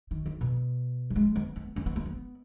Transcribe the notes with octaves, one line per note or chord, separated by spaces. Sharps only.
D#3
D#3
B2
F#3
G#3
B3
B3
C#4
B3
A#3
B3